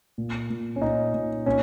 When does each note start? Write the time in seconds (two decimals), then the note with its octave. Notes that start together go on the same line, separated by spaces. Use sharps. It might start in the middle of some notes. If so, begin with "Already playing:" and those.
0.18 A#2
0.50 A#2
0.76 C#4
0.82 A#2 D#4
1.14 A#2
1.46 A#2 C#4